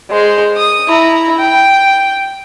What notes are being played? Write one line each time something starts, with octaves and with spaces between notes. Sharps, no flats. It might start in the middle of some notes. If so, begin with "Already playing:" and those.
G#3 C5
D#6
E4 A#5
G5